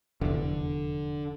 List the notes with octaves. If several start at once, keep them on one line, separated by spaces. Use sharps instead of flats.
F1 E2 D3